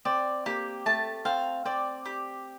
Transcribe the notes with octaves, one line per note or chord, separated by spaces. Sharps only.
C4 D5
A#3 G4
A3 A5
C4 F5
C4 D5
G4